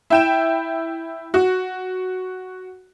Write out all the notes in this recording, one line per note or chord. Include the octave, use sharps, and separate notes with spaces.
E4 G5 E7
F#4